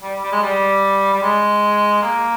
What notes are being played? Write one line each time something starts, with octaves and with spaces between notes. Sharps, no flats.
G3
G3
G#3
G3
G3
G#3
A#3